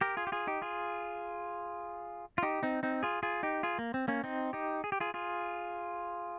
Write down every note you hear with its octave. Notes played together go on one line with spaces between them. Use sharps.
G4 A#4
F4 G#4
G4
F4 G#4
D#4 G4
F4 G#4
F4
D#4 G4
C4 D#4
C4 D#4
F4 G#4
F4 G#4
D#4 G4
F4 G#4
A#3
C4
A#3 C#4
C4 D#4
D#4 G4
G#4
G4
F4 G#4
F4 G#4